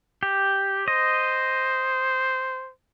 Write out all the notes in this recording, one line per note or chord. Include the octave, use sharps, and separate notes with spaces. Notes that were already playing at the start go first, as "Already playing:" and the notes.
G4
C5 D#5